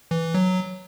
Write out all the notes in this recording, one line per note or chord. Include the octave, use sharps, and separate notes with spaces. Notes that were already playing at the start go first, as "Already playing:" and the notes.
E3
F#3